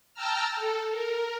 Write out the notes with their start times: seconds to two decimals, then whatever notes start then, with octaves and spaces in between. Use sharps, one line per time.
0.14 G5 A5 A#5 E6 F6
0.56 A4
0.90 A#4